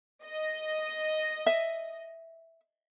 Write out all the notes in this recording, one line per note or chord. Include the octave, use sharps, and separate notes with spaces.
D#5
E5